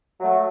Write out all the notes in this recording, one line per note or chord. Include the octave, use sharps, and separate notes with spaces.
F#3 A3